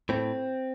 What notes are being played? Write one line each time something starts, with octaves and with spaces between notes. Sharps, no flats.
A2 C4